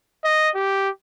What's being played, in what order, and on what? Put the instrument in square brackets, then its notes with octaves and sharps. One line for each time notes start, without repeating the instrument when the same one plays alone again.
[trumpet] D#5
G4